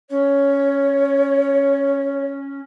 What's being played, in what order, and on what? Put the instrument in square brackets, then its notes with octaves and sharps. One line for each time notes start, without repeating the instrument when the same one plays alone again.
[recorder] C#4 [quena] C#5